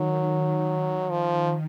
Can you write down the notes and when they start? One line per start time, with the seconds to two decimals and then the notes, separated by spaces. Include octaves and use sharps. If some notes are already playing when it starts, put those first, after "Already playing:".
Already playing: D#3 F#3
0.26 D#3
1.10 F3